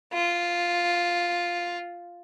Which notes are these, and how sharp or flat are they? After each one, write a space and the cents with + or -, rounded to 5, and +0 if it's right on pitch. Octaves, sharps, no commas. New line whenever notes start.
F4 +0